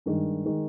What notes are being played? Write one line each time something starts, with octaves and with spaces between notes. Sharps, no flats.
G2 D#3 G#3
D#3 G#3